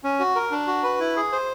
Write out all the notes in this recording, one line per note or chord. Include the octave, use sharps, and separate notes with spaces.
C#4
F#4
A#4
D4
F#4
B4
E4
G#4
C5